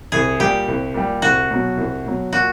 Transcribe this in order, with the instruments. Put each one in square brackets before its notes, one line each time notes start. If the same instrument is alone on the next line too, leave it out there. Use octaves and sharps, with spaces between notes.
[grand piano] C2 [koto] G#4
[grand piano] A#2 G3 [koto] G4
[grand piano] C2
A#2 G3
[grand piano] C2 [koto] F#4
[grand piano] B2 F#3
C2
B2 F#3
[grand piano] A#2 [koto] F#4